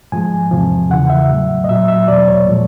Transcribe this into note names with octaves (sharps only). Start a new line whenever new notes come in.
G#2 F3 G#3 G#5
E2 C3 F3
E2 C#3 E3 F#5
E5
A2 F#3
D#5
A#2 F#3 E5
E5
E2 B2 F#3 D5
C#5
A#2 F3 G#3